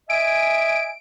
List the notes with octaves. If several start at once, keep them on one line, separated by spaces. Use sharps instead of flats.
D#5 E5 G#5 D7